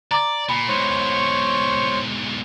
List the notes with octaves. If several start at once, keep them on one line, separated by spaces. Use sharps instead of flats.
D5 A#5 D6 A6
A#2 B5
G#2 B2 C5 C#5 C#6